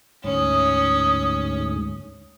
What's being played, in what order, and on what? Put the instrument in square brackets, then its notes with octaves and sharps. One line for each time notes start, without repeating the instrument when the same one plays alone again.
[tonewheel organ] D2 G#2 [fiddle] C#4 [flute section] D#6